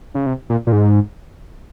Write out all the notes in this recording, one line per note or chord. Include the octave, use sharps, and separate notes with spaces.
C#3
C3
A#2
A#2
G#2